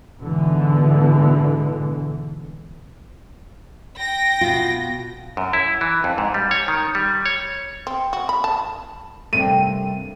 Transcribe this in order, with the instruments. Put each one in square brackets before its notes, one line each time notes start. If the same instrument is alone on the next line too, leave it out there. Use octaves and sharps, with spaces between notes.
[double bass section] G#2 B2 D3 E3
[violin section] G5 A#6
[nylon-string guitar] B2 F4
[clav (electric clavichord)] F#2
E4
E3
F2
G#2
G3
C#5
D#3
G3
C#5
[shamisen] C4
F#4
B5
A5
[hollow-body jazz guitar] G2 C3 A3 [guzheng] A#3 C4 [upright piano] D#7